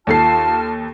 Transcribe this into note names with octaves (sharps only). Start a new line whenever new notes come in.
D#2 F4 A4 A5 F6 C7